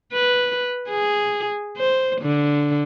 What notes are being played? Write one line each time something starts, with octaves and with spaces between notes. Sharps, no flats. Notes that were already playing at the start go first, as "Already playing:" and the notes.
B4
G#4
C5
D3